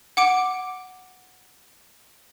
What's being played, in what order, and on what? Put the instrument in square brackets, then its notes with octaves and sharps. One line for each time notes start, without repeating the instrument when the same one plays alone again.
[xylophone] F#5 D6 D7